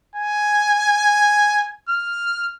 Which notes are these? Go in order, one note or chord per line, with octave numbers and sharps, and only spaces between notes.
G#5
F6